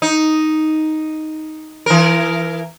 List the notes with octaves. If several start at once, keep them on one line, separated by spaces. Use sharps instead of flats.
D#4
E3 A#4